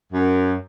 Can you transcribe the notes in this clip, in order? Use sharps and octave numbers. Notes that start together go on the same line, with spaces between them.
F#2